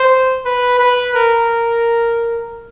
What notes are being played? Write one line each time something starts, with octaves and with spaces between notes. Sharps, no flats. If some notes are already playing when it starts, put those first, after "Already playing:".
Already playing: C5
B4
B4
A#4